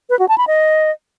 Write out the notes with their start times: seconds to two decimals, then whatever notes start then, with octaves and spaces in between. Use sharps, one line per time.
0.10 B4
0.19 F#4
0.29 A5
0.38 B5
0.47 D#5